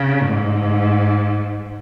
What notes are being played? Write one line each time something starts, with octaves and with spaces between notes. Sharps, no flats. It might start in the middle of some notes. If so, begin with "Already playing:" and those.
Already playing: C#3
G#2